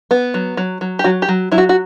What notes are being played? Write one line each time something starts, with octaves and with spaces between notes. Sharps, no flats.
B3
F#3
F#3
F#3
G4
F#3 F#4
G4
F#3
F#3 E4
F#4
F#4